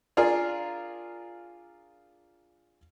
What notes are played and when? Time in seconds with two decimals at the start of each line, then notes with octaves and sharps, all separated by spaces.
0.17 D4 F4 G#4 A#4